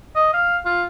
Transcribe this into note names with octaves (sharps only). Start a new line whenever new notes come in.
D#5
F5
F4